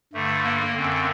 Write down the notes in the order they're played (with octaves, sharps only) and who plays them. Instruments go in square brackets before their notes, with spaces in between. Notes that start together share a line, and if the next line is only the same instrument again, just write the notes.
[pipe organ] G2 D3 A3
A#3
F#2 D3 C4